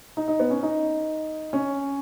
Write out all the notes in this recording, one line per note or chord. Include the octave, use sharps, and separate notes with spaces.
D#4
D#4
B3
C#4
D#4
C#4